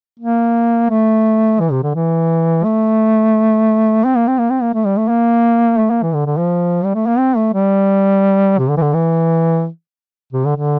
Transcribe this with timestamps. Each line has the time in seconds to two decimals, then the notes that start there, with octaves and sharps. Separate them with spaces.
0.19 A#3
0.90 A3
1.60 E3
1.71 C3
1.83 D3
1.95 E3
2.64 A3
4.05 C4
4.16 A#3
4.27 C4
4.38 A#3
4.50 C4
4.62 A#3
4.74 A3
4.85 G3
4.97 A3
5.08 A#3
5.79 A3
5.90 A#3
6.03 E3
6.14 D3
6.26 D3
6.37 F3
6.84 G3
6.95 A3
7.07 A#3
7.18 C4
7.37 A3
7.54 G3
8.58 C3
8.69 D3
8.77 E3
8.82 D3
8.94 E3
10.33 C3
10.45 D3
10.56 D3